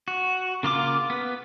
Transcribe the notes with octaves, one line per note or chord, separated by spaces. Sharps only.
F#4
C#3 A#3 F4 D6
B3 B4